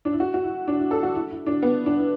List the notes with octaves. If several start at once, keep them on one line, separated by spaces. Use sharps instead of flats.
D4
E4
F#4
F#4
E4
D4
E4
A4
F#4
E4
E4
D4
B3
D4
E4